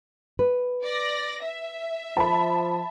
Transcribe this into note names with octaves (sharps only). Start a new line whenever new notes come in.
B4
D5 A#6
E5
F3 A5 B5